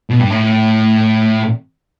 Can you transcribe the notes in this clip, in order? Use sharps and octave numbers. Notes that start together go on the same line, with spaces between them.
B2
G2
A2